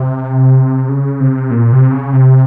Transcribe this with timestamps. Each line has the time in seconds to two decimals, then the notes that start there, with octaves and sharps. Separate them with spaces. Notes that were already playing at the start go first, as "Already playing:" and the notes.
Already playing: C3
0.89 C#3
1.20 C3
1.51 A#2
1.72 C3
1.92 C#3
2.13 C3